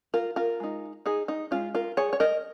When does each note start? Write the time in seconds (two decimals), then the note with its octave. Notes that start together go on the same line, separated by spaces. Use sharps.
0.14 F4 A#4
0.36 F4 A#4
0.60 G#3 D#4
1.06 D#4 G#4
1.28 D#4
1.51 G#3 C#4 F4
1.75 F4 A#4
1.97 G#4 C#5
2.13 C#5
2.20 A#4 D#5